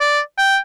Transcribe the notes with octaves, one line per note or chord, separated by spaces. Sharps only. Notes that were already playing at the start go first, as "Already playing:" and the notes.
D5
G5